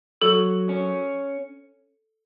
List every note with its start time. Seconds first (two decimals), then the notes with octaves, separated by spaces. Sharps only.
0.22 F#3 A4
0.69 C#4